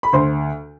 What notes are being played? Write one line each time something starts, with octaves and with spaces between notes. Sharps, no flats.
B5
D2 C5 C6